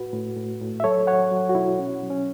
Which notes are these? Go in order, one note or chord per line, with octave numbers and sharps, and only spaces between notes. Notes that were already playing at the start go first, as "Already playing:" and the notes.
Already playing: A2 F#4 B4
A2
A2
A2
E5
F#3 A4 C#5
F#3 C#5 F#5
F#3
F#4
B2 E4
B2 C#4
F#3
C#4